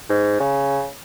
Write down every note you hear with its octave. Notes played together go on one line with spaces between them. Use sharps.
G#2
C#3